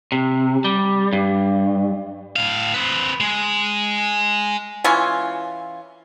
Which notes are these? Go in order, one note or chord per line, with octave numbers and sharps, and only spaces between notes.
C3
G3
G2
A2 F5
C4 B4
G#3
E3 C#4 F4 G#5